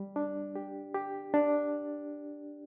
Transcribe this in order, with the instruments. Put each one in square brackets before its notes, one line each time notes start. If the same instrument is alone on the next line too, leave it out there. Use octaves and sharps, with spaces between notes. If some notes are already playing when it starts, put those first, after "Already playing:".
Already playing: [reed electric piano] G3
D4
G4
G4
D4